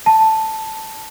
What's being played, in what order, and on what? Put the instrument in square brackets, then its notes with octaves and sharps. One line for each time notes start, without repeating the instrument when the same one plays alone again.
[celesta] A5